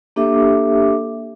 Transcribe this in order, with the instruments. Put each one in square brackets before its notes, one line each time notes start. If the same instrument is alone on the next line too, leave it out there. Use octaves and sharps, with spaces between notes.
[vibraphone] A#3 D4 G4 A4 E5 D6